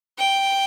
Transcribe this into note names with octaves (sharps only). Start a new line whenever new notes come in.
G5